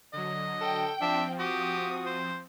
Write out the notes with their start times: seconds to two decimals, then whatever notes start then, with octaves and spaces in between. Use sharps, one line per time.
0.13 D3 F#3 D#5
0.61 A4 G5
1.01 F3 C4 D4 E5
1.39 F#4 G4 D#6
2.06 C5